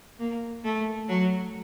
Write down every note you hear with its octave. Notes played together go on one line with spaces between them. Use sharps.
A#3
A3
F#3